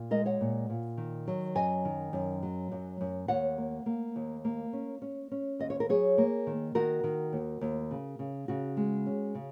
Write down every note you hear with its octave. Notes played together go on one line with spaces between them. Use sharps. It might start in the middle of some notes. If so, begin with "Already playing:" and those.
Already playing: A#2
G#3 A#4 D#5
C#5 F#5
A#2
A#2
D#3
F#3
F#2 D#5 G#5
D#3
F#2
F#3
F#2
F#2
D#2 C#5 F#5
A#3
A#3
D#2
A#3
C#4
C#4
C#4
D#2 D#5
C#5
A#4
F#3 G#4 C#5
A#3
D#3
D#3 F#4 A#4
D#3
D#2
D#2
C#3
C#3
C#3 F#4
G#3
C#4
C#3